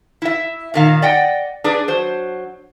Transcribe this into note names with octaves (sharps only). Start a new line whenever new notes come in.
E4 E5
A#2 D#3 F5
D5 D#5 F#5 G5
D4 G#4 B4
F#3 C5